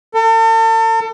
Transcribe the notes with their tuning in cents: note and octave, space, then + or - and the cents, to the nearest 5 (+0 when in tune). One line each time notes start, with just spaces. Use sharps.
A4 +40